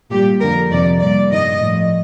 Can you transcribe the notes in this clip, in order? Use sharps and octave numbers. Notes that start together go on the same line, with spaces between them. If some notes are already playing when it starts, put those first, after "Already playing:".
A#2 G3 G4
F2 D3 F3 A#4
F2 C3 D#3 D5
A#2 G3 D5
G2 D#3 G3 D#5
A2 F3